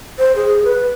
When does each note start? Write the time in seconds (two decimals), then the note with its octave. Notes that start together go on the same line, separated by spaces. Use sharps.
0.18 C5
0.36 G#4
0.64 B4